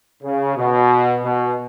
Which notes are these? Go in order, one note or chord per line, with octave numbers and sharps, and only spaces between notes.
C#3
B2
B2